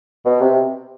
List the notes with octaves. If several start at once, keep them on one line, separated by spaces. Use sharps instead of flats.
B2
C3